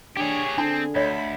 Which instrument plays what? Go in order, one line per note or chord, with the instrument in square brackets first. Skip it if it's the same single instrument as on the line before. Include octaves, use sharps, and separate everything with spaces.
[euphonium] D4 [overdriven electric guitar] G4 C#5 [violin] G#4
[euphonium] D3 [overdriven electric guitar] C4 [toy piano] D4 A5 B5
[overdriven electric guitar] D2 [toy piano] C#5 D#5 [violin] B5